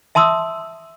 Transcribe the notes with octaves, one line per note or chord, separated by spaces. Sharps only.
E5 A5 C6 D#6 E6